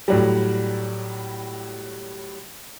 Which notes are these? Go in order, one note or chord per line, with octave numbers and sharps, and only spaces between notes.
A2 F#3 G3